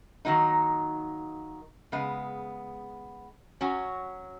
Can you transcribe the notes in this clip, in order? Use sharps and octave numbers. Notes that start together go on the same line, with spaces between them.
D#3 F#3 A#3 D#4
C#3 G#3 B3
F#3 C#4 F#4